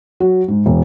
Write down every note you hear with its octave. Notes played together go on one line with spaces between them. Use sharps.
F#3
G#2
E1